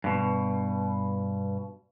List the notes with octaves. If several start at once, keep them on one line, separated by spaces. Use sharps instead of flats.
G2 B2